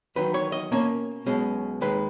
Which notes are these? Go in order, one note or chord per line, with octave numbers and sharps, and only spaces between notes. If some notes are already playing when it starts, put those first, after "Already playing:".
E2 D#3 F#3 B4
C#5
D#5
B2 A#3 C#4 C#5
B1 B2 G#3 C#4
D#2 D#3 G#3 B4